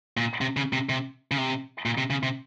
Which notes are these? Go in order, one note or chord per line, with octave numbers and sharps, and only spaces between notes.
A#2
C3
C#3
C3
C3
C#3
C3
A#2
C3
C#3
C3